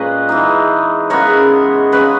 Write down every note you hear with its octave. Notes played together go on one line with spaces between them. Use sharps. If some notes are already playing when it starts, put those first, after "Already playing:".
Already playing: A#2 G#3 C#4 B4 D#5
E3 G#3 D#4
C#3 G#3 B3 A#4 C#5
C#3 G#3 C#4 G#4 B4